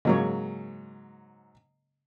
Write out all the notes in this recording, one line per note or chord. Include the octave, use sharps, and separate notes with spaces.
G#2 C#3 F#3 A#3 C#5